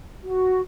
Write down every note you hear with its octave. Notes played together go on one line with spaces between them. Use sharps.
F#4